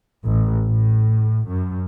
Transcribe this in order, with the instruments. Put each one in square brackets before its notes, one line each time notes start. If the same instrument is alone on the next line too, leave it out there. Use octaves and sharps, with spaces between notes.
[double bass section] A1
A2
F#2